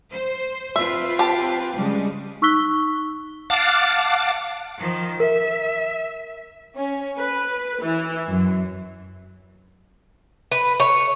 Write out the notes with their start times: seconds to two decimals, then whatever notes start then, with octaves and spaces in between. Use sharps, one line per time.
0.13 C5
0.76 C4 F4 B4 E5
1.19 G4 A5
1.77 C#3 G3 G#3
2.42 D#4 C#6 E6 F#6 B6 G7
3.50 F5 F#5 A5 D6
4.78 D#3 F3
5.20 A#4 E5
6.77 C#4
7.17 B4
7.82 E3
8.28 F#2
10.52 B4
10.80 C#5